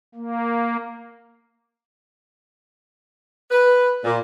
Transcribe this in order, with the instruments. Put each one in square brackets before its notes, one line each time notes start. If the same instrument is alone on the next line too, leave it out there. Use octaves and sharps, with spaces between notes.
[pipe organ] A#3
[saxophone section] B4
A#2